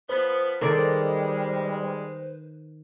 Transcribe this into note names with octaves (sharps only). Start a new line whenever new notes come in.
F3 B3 B4 C5
D#3 G3 G#3 A4 D5